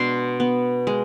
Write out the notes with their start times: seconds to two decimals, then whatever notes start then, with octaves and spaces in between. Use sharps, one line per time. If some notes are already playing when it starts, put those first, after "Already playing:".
Already playing: B2 G#3 D4 C6
0.40 B3
0.87 G#3